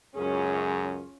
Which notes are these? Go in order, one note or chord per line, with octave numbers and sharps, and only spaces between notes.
C#2 F#2 C#4 F4 G#4